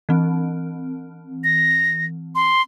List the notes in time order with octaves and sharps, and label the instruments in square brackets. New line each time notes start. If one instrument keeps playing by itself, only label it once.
[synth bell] E3 C4
[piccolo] A#6
C6